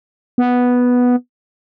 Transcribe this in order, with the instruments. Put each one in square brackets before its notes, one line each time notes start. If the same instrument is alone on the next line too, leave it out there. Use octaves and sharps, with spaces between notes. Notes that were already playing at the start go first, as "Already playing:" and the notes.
[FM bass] B3